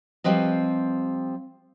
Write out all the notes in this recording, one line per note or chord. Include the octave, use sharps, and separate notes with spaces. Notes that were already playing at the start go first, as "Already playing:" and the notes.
F3 G3 C4 B4 D#5